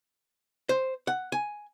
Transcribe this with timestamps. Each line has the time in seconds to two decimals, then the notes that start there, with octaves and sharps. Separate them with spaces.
0.69 C5
1.07 F#5
1.32 G#5